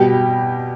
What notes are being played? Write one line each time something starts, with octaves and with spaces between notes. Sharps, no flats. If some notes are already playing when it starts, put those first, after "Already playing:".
Already playing: B2 G3 G4